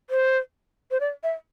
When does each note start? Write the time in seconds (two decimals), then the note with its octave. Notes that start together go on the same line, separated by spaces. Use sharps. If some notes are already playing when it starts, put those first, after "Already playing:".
0.10 C5
0.91 C5
1.00 D5
1.23 E5